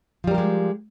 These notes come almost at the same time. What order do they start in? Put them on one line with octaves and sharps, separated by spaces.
F3 G3 A#4 G4 G#3